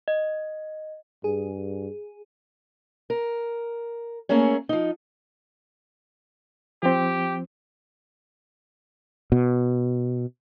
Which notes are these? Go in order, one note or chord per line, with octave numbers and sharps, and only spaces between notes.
D#5
G2 G#4
A#4
A3 A#3 C#4 G#4 C#5
F3 D#4
F3 C4 G4
B2